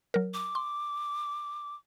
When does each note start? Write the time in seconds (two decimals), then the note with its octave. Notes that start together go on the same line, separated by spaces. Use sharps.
0.14 F#3 A#4
0.34 D6
0.55 C6